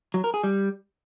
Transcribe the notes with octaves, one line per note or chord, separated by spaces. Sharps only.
F#3
A#4
G#4
G3